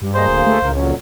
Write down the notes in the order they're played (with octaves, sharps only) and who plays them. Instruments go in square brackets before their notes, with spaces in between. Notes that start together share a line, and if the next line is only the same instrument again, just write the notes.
[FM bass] G2 [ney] G4
[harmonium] D2 A#3 G#4 [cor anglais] C5 [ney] D#5
[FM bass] D1 [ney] F5
[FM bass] A3
[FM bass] C#2 [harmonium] A2 C#3 A#4
[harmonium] F2 A#2 F#3 [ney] C#4